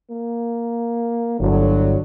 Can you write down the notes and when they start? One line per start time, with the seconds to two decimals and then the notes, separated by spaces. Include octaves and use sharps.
0.10 A#3
1.40 G1 A2 D3 F#3